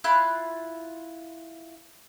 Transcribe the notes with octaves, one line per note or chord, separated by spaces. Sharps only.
E4 F4 B5 F#6